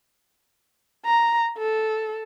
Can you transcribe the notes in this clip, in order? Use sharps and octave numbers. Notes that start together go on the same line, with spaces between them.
A#5
A4